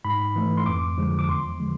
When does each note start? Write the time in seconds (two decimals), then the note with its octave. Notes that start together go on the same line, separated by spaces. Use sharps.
0.05 G#2 B5
0.36 E3 A3
0.57 C6
0.66 F2 D6
0.97 D3 F3 G#3
1.19 D6
1.29 E2 C6
1.60 D3 F3 G#3